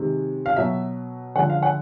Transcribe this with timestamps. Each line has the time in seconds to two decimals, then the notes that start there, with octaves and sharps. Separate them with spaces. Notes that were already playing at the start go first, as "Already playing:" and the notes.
Already playing: C3 D#3 G#3
0.46 F5
0.56 B2 F#3 E5
1.35 D3 F3 G#3 F#5
1.50 F5
1.63 F#5